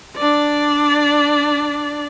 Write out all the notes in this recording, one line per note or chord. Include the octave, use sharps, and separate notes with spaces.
D4 D5